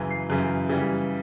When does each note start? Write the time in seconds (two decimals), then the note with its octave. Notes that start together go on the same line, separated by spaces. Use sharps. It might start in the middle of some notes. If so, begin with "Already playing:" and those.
Already playing: F#2 C#3 E3
0.11 C7
0.30 F#2 C#3 E3
0.69 C#3 E3 G3